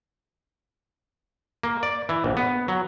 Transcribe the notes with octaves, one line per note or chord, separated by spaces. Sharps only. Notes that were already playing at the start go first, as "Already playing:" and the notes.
A#3
D5
E3
A#1
B3
F#3